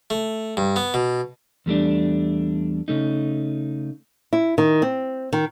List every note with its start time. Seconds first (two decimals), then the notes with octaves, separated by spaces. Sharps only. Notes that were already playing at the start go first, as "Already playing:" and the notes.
0.10 A3
0.57 G2
0.76 B3
0.94 B2
1.66 E2 G3 A3 D4
2.88 C#3 A3 D#4
4.33 E4
4.58 D#3
4.82 C4
5.33 D#3